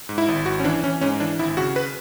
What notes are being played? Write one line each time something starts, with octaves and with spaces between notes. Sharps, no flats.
G#2
E4
G#1
G#1 F#4
C#4
E3 D4
E3 C#4
G#2 C#4
E3 D4
G#1 E4
C#3 F#4
B4